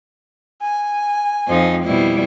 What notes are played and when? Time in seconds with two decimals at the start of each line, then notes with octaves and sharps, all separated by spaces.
0.61 G#5
1.48 F2 F3 D#4
1.85 B2 G3 E4